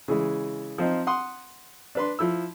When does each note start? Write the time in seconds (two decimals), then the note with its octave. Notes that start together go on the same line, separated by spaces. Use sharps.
0.08 C#3 E3 G#3
0.78 F3 C4 D#4
1.07 F#5 C6 D#6
1.95 D4 B4 C6
2.19 F3 E4 E6